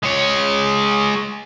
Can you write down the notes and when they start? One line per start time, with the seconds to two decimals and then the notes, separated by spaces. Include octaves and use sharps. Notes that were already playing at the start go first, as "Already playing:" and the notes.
0.03 G#3 C#5